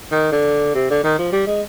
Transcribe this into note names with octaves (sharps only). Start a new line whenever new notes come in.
D#3
D3
C3
D3
D#3
F3
G3
G#3